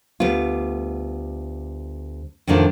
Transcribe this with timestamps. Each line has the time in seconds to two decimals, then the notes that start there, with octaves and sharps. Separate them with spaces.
0.20 D2 G3 B3 F4
2.47 F2 A2 D3 D#3 D4 F4